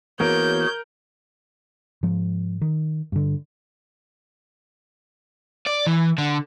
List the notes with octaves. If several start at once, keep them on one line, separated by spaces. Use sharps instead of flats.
E3 A#3 B3 F#4 G#4 A#4 C#5 G6
G#2 F3
D#3
G2 D3
D5
E3
D3